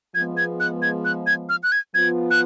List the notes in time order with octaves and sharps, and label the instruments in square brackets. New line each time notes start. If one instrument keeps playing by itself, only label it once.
[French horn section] F3 G#3 B3 [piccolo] G#6
[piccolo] G#6
F#6
G#6
F#6
G#6
F6
F#6
G#6
[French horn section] F3 B3 F4 [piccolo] G#6
[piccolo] F#6